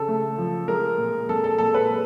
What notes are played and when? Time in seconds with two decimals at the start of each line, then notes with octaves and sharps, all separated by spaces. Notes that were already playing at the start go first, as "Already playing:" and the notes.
Already playing: C#3 A4
0.08 A3
0.38 F3
0.68 G#3 A#4
0.98 A#2
1.29 G#3 A4
1.44 A4
1.58 A#2 A4
1.74 B4
1.90 G#3